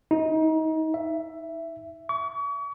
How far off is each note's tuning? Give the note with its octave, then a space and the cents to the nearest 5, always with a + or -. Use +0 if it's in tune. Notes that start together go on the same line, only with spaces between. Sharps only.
D#4 +30
E5 +10
C#6 +40